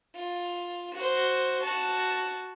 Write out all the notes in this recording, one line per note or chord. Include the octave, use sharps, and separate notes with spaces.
F4
F#4 C5
F#4 A5